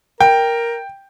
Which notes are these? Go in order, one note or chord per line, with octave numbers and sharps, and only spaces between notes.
A#4 G5